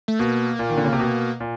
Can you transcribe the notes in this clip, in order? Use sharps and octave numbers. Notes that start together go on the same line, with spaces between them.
A3
B2 A#3
A#2
D#3
D3
C#3
C3
B2
A#2